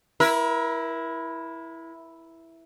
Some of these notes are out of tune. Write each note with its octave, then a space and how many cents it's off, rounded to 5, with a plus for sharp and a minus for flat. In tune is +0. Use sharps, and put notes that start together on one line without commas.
E4 +0 A#4 +35